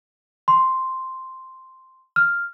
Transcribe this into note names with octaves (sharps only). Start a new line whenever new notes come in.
C6
F6